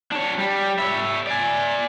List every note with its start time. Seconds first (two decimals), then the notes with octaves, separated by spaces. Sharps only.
0.12 D4 C#5
0.38 G3
0.79 C#5 E5
1.27 D5 G#5